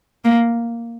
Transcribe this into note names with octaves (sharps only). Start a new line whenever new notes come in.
A#3